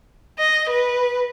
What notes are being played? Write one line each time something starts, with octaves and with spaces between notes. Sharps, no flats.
D#5
B4